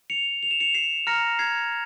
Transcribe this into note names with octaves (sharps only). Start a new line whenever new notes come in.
C#7 F7
F7
E7
C#7 F7
C7 E7
A#5 F6 A#6 C#7
G#6 C7